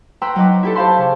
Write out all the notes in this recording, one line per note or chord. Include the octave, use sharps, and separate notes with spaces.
B4 G5 A#5 C6 E6
F#3 D#4 B4 D#5 D6
E4 G4 A4
G4 C5 F5 A5 B5 C6
C#3